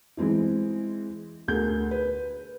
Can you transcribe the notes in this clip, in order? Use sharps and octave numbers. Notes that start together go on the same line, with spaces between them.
E3 G#3 C4 E4
D2 G#4 A#4 G6
B4